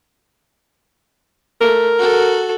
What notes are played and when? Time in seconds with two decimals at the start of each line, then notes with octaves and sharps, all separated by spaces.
1.61 A3 A#4
1.99 F#4 A4